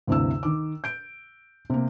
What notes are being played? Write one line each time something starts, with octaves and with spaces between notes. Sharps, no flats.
D2 G2 C3 E4 E6
D#3 D6
G6 D7
C3 A#3